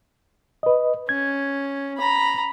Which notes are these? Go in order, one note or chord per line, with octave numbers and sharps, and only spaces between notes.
B4 D#5
C#4 G#6
A#5 B5